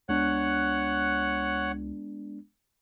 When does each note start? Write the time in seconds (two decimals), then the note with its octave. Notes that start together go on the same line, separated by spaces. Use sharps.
0.09 C#2 G#3 B3 D4 C#5 F#5 F#6